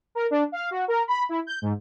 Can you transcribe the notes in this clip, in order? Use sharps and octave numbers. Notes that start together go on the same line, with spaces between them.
A#4
D4
F5
F#4
A#4
B5
E4
G6
G#2